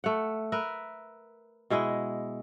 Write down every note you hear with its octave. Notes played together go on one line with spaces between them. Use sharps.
A3 F#5
A#4 B4 E5
B2 G#3 E4 D#5